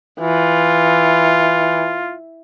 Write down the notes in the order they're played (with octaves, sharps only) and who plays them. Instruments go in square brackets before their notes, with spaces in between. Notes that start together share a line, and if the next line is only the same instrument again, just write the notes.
[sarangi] E3 [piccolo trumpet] F4